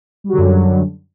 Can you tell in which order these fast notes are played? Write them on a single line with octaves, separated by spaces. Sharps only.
G3 F#3 D3 F#2